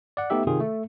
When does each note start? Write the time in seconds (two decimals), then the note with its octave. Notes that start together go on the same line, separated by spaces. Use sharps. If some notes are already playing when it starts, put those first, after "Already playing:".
0.17 D5 F#5
0.30 A3 B3 D#4 G4 E5
0.47 C3 D#3 F4 G#4
0.60 A3